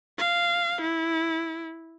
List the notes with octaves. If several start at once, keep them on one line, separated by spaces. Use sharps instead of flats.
F5
E4